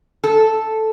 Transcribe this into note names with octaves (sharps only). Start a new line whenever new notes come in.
A4